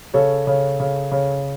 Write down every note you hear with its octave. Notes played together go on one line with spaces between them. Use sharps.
C#3 A4 C#5
C#3
C#3
C#3